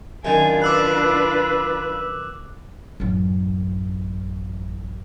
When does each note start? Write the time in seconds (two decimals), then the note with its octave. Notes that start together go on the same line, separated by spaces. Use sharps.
0.25 F#2 D#3 D4 F4 G#5
0.62 B4 D6 E6 F#6
3.00 A1 F#2